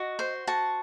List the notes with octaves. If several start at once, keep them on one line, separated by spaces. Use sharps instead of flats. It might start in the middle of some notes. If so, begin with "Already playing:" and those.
Already playing: F#4 D#5
C5
F#4 A5